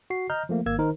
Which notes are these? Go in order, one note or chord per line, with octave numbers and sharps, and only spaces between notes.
F#4 C7
D#5 A#5 F6 G6
F3 A3 A#3
G#1 A#3 E6 G#6
D#3 D#4 A#4 C5